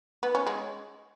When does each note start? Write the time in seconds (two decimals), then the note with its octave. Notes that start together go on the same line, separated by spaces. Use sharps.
0.23 B3
0.35 C#4
0.47 G#3